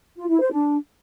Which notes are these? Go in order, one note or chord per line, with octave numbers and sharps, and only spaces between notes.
F4
E4
C5
D4